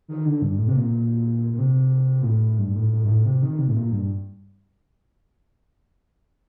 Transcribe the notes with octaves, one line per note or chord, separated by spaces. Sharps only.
D#3
D3
G2
A2
C3
A#2
A#2
C3
A#2
A2
G2
A2
A2
G2
A2
C3
D#3
C3
A2
A#2
G2